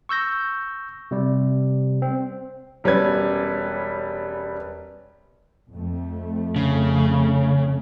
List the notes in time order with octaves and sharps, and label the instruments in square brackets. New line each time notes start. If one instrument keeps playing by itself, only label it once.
[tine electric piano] C#6 E6 G6 A#6
C3 G3
C4
[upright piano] E1 G3 C#4 B4 G#6
[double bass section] F2 A3
[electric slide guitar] C#3